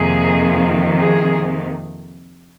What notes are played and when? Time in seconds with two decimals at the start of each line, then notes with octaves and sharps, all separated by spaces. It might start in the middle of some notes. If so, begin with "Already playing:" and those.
Already playing: F2 C3 D#3 A#3 G#4
0.98 G#4